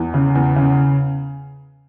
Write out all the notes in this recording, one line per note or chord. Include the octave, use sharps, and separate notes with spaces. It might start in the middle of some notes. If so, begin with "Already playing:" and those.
Already playing: E2
C#3
E2
C#3